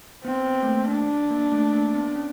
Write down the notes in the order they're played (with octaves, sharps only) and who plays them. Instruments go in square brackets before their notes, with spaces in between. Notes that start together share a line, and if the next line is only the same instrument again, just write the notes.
[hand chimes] B3 [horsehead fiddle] C4
[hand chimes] B3
A3
A#3
[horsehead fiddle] D4
[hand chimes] A#3
A3
A#3
B3
C#4